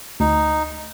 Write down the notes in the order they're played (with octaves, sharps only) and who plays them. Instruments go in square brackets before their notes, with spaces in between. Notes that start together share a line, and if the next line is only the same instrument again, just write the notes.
[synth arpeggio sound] D2 [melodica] D#4